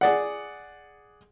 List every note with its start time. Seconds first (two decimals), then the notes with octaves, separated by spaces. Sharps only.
0.01 G#4 D5 F#5